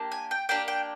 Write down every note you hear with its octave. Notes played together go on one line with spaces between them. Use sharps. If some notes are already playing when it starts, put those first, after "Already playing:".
Already playing: A#3 D4 G4
G#5
G5
A#3 D4 G4 G5
G5